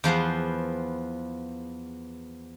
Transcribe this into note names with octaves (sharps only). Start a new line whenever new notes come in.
E2 F3 B3 C5